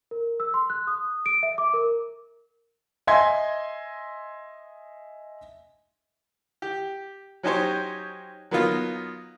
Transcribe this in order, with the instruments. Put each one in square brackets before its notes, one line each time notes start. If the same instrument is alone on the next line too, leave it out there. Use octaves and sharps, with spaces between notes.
[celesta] A#4
E6
C6
F#6
D#6
D7
E5
D6
A#4
[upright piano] D#5 E5 G#5 C6 G#6
[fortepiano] G4
F#3 C#4 D#4 G4 C5 C#5
F#3 A#3 B3 D#4 F4